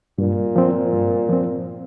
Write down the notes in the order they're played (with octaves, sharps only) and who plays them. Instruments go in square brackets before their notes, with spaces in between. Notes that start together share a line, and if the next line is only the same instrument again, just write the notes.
[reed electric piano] G2 [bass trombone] A#2
[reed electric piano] F3 C4
G2
F3 C4